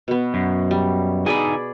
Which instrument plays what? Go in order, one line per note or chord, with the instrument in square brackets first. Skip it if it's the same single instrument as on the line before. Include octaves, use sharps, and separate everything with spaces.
[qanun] B2 B3
[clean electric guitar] F#2
[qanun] G3
[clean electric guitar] D3 D#4 G#5 [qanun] G#4 D5 B5